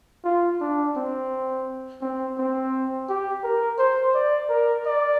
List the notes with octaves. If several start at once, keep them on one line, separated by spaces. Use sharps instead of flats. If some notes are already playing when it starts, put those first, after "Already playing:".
F4
D4
C4
C4
C4
G4
A#4
C5
D5
A#4
D5